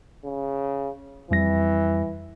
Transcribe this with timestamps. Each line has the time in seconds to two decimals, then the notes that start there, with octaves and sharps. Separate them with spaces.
0.25 C#3
1.31 F2 E3 G3 A#6